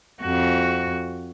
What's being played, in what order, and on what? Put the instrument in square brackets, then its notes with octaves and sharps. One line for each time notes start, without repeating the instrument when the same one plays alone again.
[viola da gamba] F2 F#4